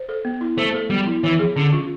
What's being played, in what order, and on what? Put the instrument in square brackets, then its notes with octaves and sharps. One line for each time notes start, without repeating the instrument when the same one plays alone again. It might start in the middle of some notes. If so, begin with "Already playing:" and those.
Already playing: [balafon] C5
A4
B3
E4
[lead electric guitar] A3 [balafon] C5
[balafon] A4
[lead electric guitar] G3 [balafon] B3
[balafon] E4
[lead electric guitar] E3 [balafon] C#5
[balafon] G#4
[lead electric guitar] D3 [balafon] C#4
[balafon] F4